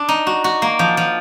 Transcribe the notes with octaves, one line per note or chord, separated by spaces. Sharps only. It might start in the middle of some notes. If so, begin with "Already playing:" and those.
Already playing: D4
D#4
F#4
F#4
A#3
F3
F3